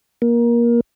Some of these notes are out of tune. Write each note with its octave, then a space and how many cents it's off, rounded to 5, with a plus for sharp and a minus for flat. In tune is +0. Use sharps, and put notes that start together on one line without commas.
A#3 +20